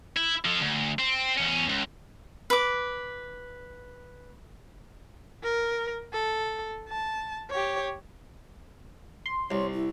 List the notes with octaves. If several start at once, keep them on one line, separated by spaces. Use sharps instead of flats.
E4
F3 A4
D2
C4
E2 C#4
C#2
B4 D6
A#4
A4
A5
G4 C#5
C6
C2 C#5
E4